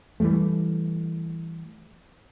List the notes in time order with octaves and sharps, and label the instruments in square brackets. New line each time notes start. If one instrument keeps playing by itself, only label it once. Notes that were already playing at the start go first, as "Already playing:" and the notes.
[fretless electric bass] E3 F3 G3 A3